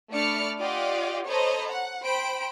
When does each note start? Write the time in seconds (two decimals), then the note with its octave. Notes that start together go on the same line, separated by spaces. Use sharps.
0.11 A3 D4 D5 B5 F6 C#7
0.61 F4 G4 D5 D#5 F5 F#5
1.28 A4 C5 C#5 D#5 A#5 B5
1.70 F#5
2.04 C5 G5 B5 D7